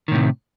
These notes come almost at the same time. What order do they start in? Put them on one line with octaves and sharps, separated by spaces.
D#3 A2 C3